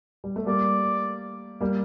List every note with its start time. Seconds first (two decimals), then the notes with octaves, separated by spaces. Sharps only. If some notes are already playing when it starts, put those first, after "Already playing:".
0.24 G3
0.36 A3
0.46 G3 A#3 D5
1.61 G3 A#3